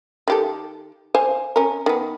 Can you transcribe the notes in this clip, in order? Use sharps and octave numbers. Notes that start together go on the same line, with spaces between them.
D#3 G4 A4
C5 F5 G#5
C#4 A#4
D#3 B3